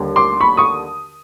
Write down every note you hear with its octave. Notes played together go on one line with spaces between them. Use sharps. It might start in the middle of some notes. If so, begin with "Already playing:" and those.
Already playing: D#2 D3 G3
C6 D6
B5 C#6
C#6 D#6